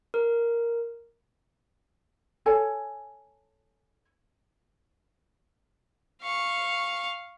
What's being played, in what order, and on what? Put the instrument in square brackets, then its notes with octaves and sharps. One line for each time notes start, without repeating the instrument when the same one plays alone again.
[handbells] A#4
[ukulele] A4 C#5 G#5
[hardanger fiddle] F5 C#6